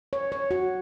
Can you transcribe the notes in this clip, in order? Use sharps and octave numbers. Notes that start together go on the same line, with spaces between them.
C#5
C#5
F#4